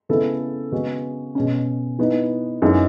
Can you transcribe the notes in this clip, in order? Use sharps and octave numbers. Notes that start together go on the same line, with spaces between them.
C#3 G#3 B3 E4 A4
C#3 G#3 B3 F#4
B2 G#3 C#4
E3 B3 D#4
F#2 E3 G#3 D#4